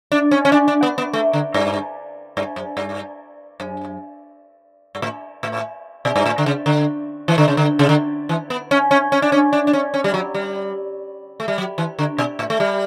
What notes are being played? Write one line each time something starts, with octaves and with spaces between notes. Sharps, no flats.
D4
C#4
C#4
D4
D4
B3
B3
A3
D3
G2
G2
F#2
G2
F#2
G2
A2
A2
B2
G2
A2
D3
C#3
D3
E3
D3
C#3
D3
C#3
D3
E3
B3
C#4
C#4
C#4
D4
C#4
D4
D4
C#4
C#4
G3
F#3
G3
A3
G3
F#3
E3
D3
B2
A2
A3
G3